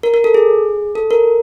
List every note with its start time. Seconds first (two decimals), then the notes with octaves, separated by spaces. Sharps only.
0.03 A#4
0.14 A#4
0.24 A4
0.34 G#4
0.95 A4
1.11 A#4